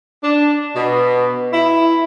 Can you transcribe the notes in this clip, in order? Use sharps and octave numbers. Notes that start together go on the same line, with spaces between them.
D4
B2
E4